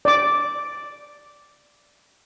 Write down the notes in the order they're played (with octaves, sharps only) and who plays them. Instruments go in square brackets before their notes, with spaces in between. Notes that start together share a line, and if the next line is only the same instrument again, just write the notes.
[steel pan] D5 D6